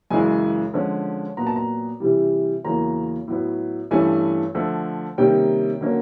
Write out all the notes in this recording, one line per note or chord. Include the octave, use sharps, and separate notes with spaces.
F#2 C#3 E3 G#3 G#5
D3 F3 G#3 C#4
A#2 F#3 B3 A#5
A5
A#5
C3 E3 G3
E2 C#3 F#3 A#3 C#4 A#5
A2 F#3 B3
G2 E3 A3 C#4 G#5
D3 F3 A3
C3 D#3 G3 A#3 C#4 G5
D3 F#3 A#3 C#4